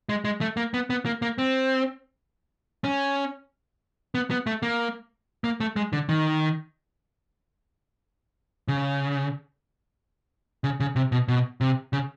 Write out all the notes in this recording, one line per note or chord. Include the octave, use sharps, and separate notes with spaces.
G#3
G#3
A3
A#3
B3
B3
A#3
A#3
C4
C#4
B3
B3
A3
A#3
A#3
A3
G#3
D3
D#3
C#3
C#3
C#3
C3
B2
B2
C3
C#3